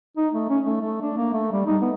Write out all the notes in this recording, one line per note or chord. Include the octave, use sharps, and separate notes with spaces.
D#4
A3
C#4
A3
A3
D4
A#3
A3
G3
D#4
B3